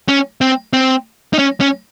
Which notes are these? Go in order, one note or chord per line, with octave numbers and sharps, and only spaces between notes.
C#4
C4
C4
D#4
C#4
C#4